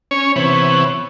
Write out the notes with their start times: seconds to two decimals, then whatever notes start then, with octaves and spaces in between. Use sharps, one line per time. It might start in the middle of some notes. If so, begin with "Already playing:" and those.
0.11 C#4 C#5
0.36 C3 E3 B3 C#5